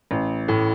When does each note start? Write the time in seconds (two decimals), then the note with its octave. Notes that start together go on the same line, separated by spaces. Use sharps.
0.11 A1
0.48 A2